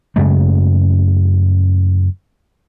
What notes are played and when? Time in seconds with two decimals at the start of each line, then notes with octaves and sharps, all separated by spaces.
0.16 F#2 C#3 G#3 A3